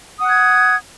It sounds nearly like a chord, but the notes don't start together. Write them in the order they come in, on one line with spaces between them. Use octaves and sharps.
D#6 F#5 F#6 G#6